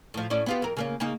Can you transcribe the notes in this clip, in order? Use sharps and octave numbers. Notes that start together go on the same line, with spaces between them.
A2 F3
A2 C#4 D5
B3 F4 G4
F2 A#4
C#3 A#3 C#4
C#3 A#3 D#4